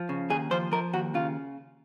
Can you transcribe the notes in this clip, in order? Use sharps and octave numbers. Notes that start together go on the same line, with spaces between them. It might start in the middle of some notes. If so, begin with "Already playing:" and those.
Already playing: F3
C#3
D#2 G#4
F3 C5
F3 A#4
D#2 F#4
C#3 F4